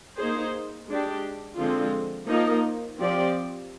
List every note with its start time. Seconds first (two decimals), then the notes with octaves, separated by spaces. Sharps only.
0.17 A#3 D#4 G#4 C5
0.87 G#3 D4 G4
1.57 D3 F3 G#3 C4 F4
2.27 F3 A#3 D#4 A#4
2.98 F3 C4 G4 D5